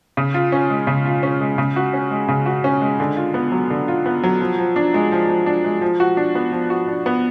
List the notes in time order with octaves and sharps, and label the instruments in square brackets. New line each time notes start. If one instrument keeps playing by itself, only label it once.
[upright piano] C#3
F4
C#4
G#3
C#3
F4
C#4
G#3
C#3
F#4
C#4
G#3
C#3
F#4
C#4
G#3
D3
F4
B3
F#3
D3
F4
B3
F#3
F3
F3
D4
G#3
F3
F3
D4
G#3
F3
F#4
D4
B3
F3
F#4
D4
B3